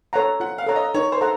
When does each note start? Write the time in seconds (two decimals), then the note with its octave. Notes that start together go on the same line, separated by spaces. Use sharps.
0.13 A4 C#5 F#5 A#5
0.40 F4 F#5
0.58 F5
0.67 A4 C#5 F#5 A#5
0.76 D#5
0.94 D#4 C#5
1.12 C5
1.21 A4 F#5 A#5